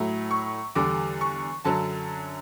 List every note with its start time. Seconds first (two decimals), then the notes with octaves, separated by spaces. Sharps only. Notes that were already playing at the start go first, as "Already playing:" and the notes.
Already playing: A2 F#3 A3
0.31 C#6
0.75 E2 D3 G3 D6
1.21 C#6
1.65 F#2 D3 F#3 A5